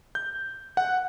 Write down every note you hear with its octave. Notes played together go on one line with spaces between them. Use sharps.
G6
F#5